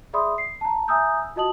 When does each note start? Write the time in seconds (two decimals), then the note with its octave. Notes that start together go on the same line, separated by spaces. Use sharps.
0.13 G#4 D5 E5 B5 C6 D#6
0.38 C7
0.61 A5 A#5
0.88 E5 G#5 A#5 D#6 E6 G6
1.36 F4 F#4 D#5 A5 D#6 F#7